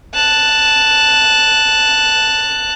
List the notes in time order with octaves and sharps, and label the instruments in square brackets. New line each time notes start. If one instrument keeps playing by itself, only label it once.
[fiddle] A5 F#6